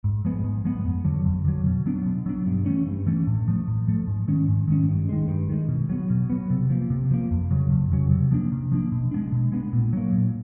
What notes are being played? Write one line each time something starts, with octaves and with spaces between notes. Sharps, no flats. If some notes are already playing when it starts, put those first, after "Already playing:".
G#2
F3 G#3 B3
G#2
F3 G#3 B3
F2
D3 F#3
F2
D3 F#3
B2
F#3 B3 D4
B2
F#3 B3 D4
G2
E3 A3 C#4
G2
E3 A3 C#4
A2
F3 A3
A2
F3 A3
G#2
D#3 G#3 C#4
G#2
D#3 G#3 C#4
G2
D#3 G#3
G2
D#3 G#3
B2
F#3 B3
B2
F#3 B3
C3
F3 A#3
C3
F3 A#3
F2
C#3 F#3
F2
C#3 F#3
C3
F3 A#3 D4
C3
F3 A#3 D4
B2
G#3 B3 D4
B2
G#3 B3 D4
A#2
F#3 A#3
A#2